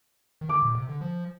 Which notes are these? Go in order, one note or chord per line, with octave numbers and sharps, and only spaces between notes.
D#3
D3 D6
A#2
C3
D3
F3